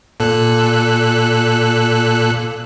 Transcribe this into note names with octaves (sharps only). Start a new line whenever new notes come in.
A#2 A4 F#6